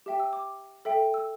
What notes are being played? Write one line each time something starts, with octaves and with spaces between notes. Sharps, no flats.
G4 E5 G5
E6
D6
A4 E5 G5
E6